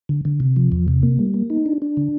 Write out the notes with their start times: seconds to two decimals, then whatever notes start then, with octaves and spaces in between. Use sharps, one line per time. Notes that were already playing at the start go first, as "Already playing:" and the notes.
0.09 D3
0.25 D3
0.40 C3
0.56 F3
0.72 E2
0.88 C3
1.03 A#3
1.19 G3
1.34 A#3
1.50 D#4
1.66 D4
1.82 D4
1.97 D3